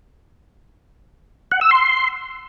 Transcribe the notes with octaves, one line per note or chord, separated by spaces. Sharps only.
F#5
E6
C6